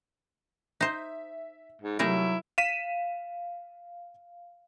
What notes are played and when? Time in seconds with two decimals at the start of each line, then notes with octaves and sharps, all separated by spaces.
0.81 D#4 C5 E5
1.82 G#2
1.99 C3 F#3 G3 A3 D#4 E4 G#4 A#4
2.58 F5 B6 D#7 E7